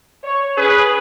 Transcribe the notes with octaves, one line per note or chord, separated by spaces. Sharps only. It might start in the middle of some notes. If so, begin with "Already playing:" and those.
C#5
C#4 G#4 B4